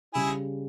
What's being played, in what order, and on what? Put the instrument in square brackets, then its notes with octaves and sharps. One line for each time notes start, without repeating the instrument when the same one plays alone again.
[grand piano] C#3 G3 [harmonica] E4 G#4